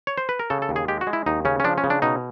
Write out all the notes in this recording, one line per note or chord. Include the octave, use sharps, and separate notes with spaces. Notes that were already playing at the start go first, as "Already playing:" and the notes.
C#5
C5
B4
A#4
C#3 A4
A4
D#2
G#4
G#3 G4
F#4
G#3
E4
D#2 D#4
C#3 C#4
C#4
F3 D4
C#4
C#3
D4
B2 D#4